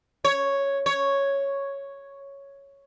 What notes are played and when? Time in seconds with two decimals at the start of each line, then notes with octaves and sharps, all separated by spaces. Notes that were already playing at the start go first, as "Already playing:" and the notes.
0.25 C#5
0.86 C#5